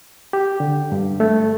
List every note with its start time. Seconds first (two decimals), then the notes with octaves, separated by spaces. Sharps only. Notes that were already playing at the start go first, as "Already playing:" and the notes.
0.33 G4
0.60 D3
0.92 G2
1.20 A3